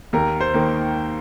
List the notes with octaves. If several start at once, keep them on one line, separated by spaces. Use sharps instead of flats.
D#2 A#4
C5
D#3 A#3